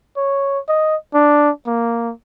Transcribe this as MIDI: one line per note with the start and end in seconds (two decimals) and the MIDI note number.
0.17 0.59 73
0.68 0.96 75
1.14 1.50 62
1.67 2.12 58